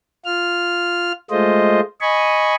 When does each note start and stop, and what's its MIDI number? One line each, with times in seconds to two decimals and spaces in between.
0.25 1.12 65
0.25 1.12 89
1.30 1.80 56
1.30 1.80 57
1.30 1.80 65
1.30 1.80 72
1.30 1.80 75
2.01 2.55 75
2.01 2.55 80
2.01 2.55 83
2.01 2.55 85